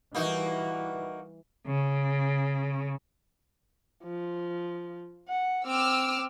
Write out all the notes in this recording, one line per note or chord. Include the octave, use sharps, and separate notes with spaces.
E3 G3 A#3 D#4 F#4
C#3
F3
F#5
C4 D6 E6 F6